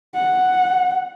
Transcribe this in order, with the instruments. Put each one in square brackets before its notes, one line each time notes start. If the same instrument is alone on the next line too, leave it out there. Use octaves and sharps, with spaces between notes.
[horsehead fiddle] F#5